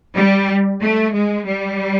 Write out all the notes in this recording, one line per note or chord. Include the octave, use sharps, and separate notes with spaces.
G3
A3
G#3
G3